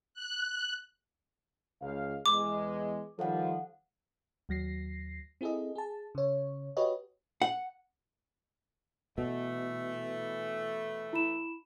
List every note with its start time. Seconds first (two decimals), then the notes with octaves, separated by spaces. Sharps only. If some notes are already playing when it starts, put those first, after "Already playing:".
0.14 F#6
1.81 C#2 F5
2.26 E2 G#3 D6
3.19 D#3 F3 G3 A4 F5 F#5
4.49 D#2 F#3 A#6 C7
5.41 C4 E4 G#4 A4 D#5
5.75 G#4 A5
6.15 C#3 C#5
6.77 F#4 G4 B4 C#5 D#5
7.42 F#5
9.18 B2 E3 A3
11.13 E4 B5 E7